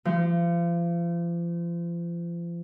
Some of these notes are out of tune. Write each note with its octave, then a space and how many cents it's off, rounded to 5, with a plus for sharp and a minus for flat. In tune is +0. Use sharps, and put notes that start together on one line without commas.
F3 -35